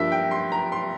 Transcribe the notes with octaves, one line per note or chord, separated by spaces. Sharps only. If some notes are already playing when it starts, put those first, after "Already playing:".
Already playing: G2 F3 A#3 E5
G5
C6
A#5
C6